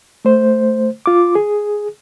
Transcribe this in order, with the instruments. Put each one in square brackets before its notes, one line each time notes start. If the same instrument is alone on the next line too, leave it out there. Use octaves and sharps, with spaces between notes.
[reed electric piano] A3 C5
F4 D6
G#4